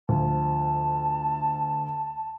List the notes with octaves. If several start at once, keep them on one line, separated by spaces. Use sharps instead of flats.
D2 F3 A5